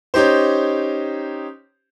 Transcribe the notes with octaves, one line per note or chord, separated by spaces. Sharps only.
C#4 D#4 G4 C5